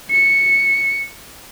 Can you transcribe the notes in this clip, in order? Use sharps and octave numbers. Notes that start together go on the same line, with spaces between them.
C#7